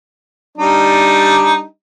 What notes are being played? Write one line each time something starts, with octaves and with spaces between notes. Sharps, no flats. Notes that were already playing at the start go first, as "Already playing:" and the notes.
G3 D4 D#4